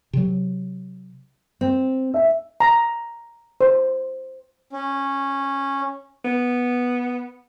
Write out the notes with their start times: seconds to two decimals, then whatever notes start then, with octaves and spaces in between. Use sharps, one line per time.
0.13 C3 F#3
1.61 C4
2.14 E5
2.60 A#5
3.61 C5
4.73 C#4
6.25 B3